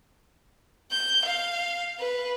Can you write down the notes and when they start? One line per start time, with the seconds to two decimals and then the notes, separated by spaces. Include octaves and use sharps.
0.91 G6
1.24 F5
1.99 B4